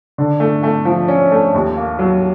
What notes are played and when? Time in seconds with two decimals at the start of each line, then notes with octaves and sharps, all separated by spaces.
0.18 D3
0.40 A3
0.63 A3
0.85 F3
1.08 C#4
1.32 A3
1.54 D#2
1.77 A#3
1.99 F#3